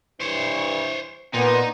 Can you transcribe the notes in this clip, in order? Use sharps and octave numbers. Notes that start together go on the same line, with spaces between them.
G2 E3 C5 C#5
A#2 B3 D#4